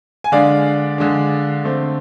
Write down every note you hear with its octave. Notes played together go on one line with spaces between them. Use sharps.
G#5
D3 G#3 D4 D5 F5
D3 G#3 D4
D3 A3 C4